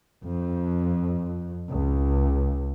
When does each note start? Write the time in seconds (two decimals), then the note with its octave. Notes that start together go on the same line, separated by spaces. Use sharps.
0.24 F2
1.68 C#2